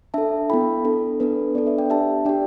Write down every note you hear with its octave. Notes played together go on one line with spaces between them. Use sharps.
D4 A4 E5 A5
B3 E4 A4 G5 B5
D4 A4
B3 D4 A4 B4
B3 D4 A4 D5
B4 E5
D5 G5
D4 G4 E5 A5
D4 G4 D5 G5